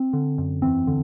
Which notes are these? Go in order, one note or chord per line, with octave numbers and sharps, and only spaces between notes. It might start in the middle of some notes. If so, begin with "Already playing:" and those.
Already playing: C4
D3
F#2
E2 C4
D3